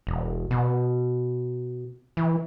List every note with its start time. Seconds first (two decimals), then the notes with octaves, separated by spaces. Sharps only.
0.07 E1
0.51 B2
2.17 E3